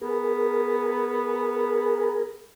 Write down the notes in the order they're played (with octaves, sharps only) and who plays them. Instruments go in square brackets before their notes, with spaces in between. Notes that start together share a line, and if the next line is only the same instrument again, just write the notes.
[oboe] B3 [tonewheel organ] G#4 A#4